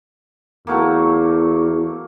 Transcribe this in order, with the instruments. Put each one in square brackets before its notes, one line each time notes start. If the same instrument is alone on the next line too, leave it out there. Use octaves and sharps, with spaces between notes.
[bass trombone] E2 [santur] F#3 A3 A#3